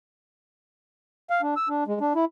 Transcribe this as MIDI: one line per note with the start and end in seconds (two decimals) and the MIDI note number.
1.30 1.41 77
1.42 1.54 62
1.57 1.68 88
1.69 1.84 62
1.87 1.99 56
2.01 2.13 62
2.15 2.25 64